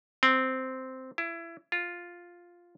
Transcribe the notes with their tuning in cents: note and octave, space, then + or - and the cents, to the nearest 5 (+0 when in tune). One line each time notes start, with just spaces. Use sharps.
C4 -5
E4 +25
F4 +0